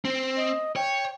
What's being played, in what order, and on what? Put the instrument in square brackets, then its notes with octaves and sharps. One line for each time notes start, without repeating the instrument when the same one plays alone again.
[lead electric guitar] C4
[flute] D#5
[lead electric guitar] C#5 [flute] G5